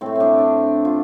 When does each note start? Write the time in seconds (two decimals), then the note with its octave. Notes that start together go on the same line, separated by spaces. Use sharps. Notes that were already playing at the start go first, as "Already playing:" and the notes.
0.01 A2 A3 C4
0.15 C4 D4
0.39 D4
0.85 F4